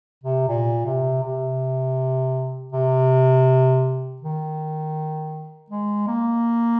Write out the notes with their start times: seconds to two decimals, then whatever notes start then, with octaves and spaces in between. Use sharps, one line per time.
0.24 C3
0.48 A#2
0.86 C3
1.23 C3
2.72 C3
4.22 D#3
5.70 G#3
6.08 A#3